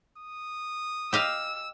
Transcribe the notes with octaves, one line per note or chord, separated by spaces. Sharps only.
D#6
G4 D#5 F5 E6